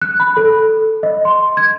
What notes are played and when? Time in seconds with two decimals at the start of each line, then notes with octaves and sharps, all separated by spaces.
0.02 F#6
0.20 B5
0.37 A4
1.03 D#5
1.25 C6
1.57 G#6